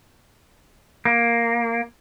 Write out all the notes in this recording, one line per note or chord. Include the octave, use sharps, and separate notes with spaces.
A#3